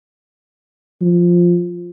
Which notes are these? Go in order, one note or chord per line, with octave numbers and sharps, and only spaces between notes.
F3